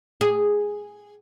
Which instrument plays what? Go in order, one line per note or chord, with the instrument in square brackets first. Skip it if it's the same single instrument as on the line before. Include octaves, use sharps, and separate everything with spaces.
[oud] G#4